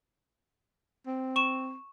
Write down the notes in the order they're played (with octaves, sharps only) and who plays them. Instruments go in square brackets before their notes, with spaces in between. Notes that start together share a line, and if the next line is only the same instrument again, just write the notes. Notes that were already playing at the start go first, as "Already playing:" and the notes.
[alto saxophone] C4
[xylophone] C#6 E7